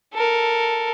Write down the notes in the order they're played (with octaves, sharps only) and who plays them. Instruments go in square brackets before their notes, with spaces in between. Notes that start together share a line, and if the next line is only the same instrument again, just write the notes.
[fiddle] A4 A#4